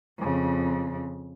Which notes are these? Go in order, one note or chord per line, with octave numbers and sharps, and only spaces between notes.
F2 C#3